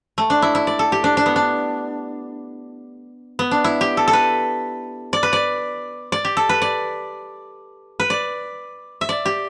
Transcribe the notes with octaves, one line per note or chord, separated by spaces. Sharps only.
A3
D4
E4
E4
D5
A4
G4
D4
D4
B3
D4
B3
D4
E4
G4
A4
A4
B4
D5
B4
D5
D5
G4
A4
B4
D5
B4
D5
E5
D5
G4